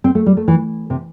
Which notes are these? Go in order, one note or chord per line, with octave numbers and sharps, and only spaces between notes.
C4
A3
G3
A3
E3
C3